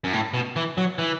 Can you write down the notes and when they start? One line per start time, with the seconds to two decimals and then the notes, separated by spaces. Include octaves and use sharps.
0.04 F#2
0.13 A2
0.34 B2
0.56 E3
0.78 F#3
0.99 E3